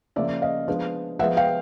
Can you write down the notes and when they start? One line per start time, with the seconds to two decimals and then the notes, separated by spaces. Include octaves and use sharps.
0.16 C#3 F3 A#3 C#4 D5 E5
0.42 D#5 F5
0.68 F3 G#3 B3 D4
1.19 F3 G#3 B3 E5 F#5
1.37 F5 G5